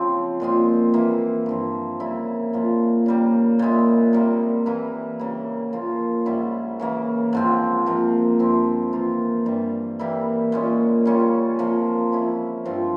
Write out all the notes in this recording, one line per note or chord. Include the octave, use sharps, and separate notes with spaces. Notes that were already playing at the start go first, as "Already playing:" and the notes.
Already playing: C#3 F3 C4
A#2 G#3 C4 F4
E3 A#3 E4
G2 F3 C4
C#3 G3 A#3 E4
A#2 F3 A#3
C#3 G3 A#3
A#2 G#3 E4
C3 G3 A#3
E3 A#3 E4
C#3 G3 A#3 E4
F3 A#3 F4
G#2 G3 C#4 E4
C#3 E3 A#3
G#2 F3 C4
C3 F3 A#3
G2 F3 C4 E4
E3 A#3 F4
G2 E3 G3
E3 G3 A#3 E4
A#2 G#3 C#4
C#3 G3 C#4 F4
C3 F3 A#3
F3 G#3 C#4 E4
G2 F3 C4 F4